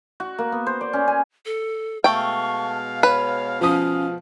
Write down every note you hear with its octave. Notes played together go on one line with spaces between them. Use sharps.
F#4
A#3
B3
C5
D5
C#4
G#5
A4
B2 G#3 A3 F5 G5 C#6
B4 C#5
F3 C#4 D#6